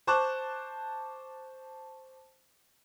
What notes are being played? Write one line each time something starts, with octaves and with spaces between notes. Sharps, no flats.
C5 A5 C#6 D6 F#6